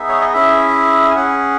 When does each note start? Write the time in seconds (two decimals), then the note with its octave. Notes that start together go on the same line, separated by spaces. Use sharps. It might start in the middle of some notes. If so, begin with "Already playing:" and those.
Already playing: B3 D#4 G#4 E5
0.09 C#5
0.21 D#5
0.33 C#4 E4 G#4 E5
1.11 G#5
1.15 C#4 G#4 F#5